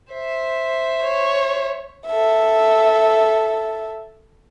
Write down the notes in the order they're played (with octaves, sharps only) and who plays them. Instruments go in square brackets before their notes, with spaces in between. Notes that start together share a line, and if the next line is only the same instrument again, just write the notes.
[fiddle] C5 E5
[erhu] C#5
[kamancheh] A4 E5